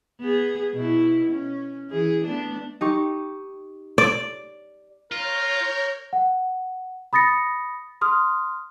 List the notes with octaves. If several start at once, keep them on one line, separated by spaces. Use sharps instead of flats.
B3 G#4
B2 E4
C#4
E3 G#4
A3 B3 D4
D#4 G4 C#6
D5
F4 A#4 C#5 F6 G6
F#5
B5 D#6 A6 A#6 C#7
C6 D#6 F6